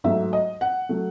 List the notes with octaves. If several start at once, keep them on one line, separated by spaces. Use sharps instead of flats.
G#2 F#3 A3 E5
D#5
F#5
F#3 A3